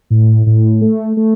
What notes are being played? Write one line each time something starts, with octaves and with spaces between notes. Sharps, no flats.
A2
A2
A3
A3